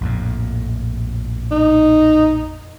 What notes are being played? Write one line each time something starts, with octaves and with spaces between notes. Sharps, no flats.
A#1 F2 A2
D#4